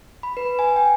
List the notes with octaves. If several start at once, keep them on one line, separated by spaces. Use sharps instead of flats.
B5
B4
G#5
G5